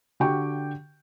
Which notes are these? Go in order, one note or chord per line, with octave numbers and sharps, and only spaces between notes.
D3 F#4 G4 G5 C#6